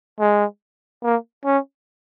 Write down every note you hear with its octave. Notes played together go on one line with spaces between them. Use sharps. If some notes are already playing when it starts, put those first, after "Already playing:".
G#3
A#3
C#4